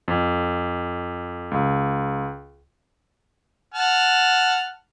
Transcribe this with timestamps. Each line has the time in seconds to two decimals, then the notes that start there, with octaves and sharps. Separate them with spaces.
0.08 F2
1.51 C#2
3.74 F#5 A5 F6